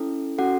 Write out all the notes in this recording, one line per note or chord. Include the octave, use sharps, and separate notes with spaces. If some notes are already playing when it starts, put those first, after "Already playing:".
Already playing: C#4 E4 A4
C#4 F#4 A4 F#5